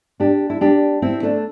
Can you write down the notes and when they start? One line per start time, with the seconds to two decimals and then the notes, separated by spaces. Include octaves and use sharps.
0.20 D4 G4
0.50 E4
0.61 D4 G4
1.02 C4 E4
1.23 A3 D4